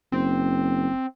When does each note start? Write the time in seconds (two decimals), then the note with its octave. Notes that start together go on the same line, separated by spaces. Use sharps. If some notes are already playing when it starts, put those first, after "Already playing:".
0.12 F#1 C4